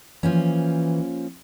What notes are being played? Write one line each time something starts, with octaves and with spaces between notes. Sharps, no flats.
E3 F3 A#3 C#4